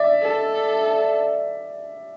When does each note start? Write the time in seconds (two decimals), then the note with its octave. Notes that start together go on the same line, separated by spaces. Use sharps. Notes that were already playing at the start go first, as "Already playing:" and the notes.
Already playing: D5 E5
0.22 A4